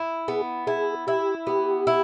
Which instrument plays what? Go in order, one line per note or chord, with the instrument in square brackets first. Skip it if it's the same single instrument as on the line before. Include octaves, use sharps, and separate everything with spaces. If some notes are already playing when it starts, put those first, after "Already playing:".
Already playing: [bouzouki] E4
[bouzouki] B3 [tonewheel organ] G#4
[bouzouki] E4 [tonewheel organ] G#4
[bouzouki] E4 [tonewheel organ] G4
[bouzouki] B3 [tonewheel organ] G4
[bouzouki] E4